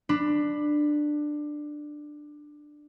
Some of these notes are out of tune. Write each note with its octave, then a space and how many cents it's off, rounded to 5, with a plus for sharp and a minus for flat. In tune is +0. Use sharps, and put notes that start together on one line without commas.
D4 +15 B5 +0